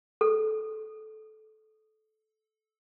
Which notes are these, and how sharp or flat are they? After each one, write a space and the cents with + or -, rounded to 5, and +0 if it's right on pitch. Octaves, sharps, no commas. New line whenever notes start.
A4 -20